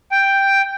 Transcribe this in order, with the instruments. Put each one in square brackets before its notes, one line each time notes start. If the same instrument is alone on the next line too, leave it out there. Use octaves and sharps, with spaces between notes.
[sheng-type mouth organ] G5